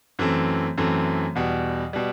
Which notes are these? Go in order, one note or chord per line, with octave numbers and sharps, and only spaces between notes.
F#2 E3 A3 C4
F#2 E3 A3 C4
E2 B2 G3
B2 G3